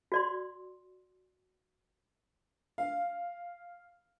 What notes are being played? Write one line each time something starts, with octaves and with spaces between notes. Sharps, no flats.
F#4 D5 C6
F5